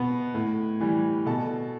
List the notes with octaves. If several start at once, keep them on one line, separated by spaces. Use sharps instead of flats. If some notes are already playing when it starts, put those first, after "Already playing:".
Already playing: B2 B3
A2
E3 G3
B2 A4 A5